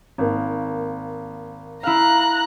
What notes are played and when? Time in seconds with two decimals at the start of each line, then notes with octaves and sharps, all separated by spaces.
0.18 G#1 A#3
1.83 E4 F5 A#5 F#6